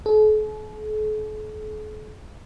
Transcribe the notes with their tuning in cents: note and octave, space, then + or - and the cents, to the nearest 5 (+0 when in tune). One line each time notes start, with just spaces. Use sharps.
A4 -45